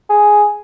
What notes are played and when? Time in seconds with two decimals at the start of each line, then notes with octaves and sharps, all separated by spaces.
0.09 G#4